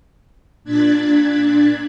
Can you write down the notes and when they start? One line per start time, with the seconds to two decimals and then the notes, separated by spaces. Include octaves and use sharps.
0.64 A#2 D4 F#6 G#6 A6 B6